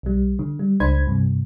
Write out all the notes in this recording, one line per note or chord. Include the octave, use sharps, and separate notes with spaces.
B1 G3
D3
G3
C#2 D4 C5 B5 G#6
G2 C3